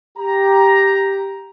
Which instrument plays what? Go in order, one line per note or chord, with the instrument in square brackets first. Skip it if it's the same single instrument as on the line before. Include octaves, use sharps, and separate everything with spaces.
[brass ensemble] G4 A#5